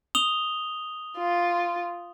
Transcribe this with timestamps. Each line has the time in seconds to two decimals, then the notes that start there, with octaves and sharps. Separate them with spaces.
0.15 D#6 F7 G7
1.17 F4